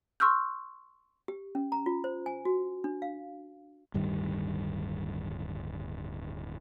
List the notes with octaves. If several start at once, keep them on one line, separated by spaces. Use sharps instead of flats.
C6 C#6 E6 F6 G6
G4
C#4
A#5
F4
C5
G#5
F#4
D4
F5
D1 G2 D#3 G3